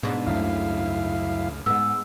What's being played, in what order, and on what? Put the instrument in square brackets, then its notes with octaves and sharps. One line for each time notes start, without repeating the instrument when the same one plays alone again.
[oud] G#2 D4 [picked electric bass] B2
[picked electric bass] C#2 C#3 A3 [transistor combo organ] F#2 E4 F5
[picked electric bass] G#2 G#3 [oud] B3 [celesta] E6